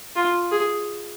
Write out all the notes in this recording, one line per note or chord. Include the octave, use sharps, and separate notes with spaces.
F4
G#4